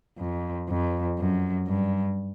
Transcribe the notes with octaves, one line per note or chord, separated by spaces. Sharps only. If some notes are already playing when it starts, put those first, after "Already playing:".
F2
F2
F#2
G2